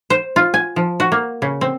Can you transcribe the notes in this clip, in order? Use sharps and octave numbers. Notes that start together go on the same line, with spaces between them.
C5
F4
G#5
F3
F#4
A#3
C#3
C4